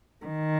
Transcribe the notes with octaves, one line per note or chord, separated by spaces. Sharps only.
D#3